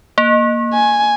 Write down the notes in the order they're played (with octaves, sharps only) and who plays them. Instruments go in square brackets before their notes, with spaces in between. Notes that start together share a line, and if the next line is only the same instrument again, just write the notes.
[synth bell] A#3
[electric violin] G#5